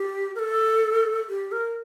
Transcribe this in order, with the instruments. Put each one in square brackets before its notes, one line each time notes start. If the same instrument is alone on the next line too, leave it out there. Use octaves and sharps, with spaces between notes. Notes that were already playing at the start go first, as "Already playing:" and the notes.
Already playing: [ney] G4
A#4
A4
G4
A#4